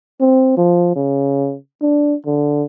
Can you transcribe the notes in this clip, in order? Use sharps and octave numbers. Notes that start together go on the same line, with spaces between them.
C4
F3
C#3
D4
D3